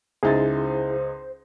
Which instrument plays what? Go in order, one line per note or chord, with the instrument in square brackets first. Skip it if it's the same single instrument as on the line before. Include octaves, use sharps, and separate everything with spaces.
[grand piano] C#2 D#4 A6 [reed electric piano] E4 G#4 [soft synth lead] C5